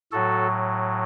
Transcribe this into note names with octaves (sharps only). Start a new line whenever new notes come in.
A2 F#3 F#4 A4